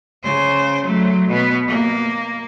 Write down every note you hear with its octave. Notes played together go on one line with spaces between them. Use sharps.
C#3 C5
F#3 A3
B2 B3
A#3